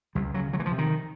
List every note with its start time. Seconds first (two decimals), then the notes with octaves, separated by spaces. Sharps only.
0.15 C#2 G3
0.34 C#3 F#3
0.53 D2 F#3
0.60 E3
0.66 F3
0.72 C3
0.78 D#3